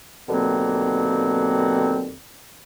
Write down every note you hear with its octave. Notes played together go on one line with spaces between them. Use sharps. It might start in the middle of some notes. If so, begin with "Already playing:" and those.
D#2 B2 D3 F#3 A#3 C4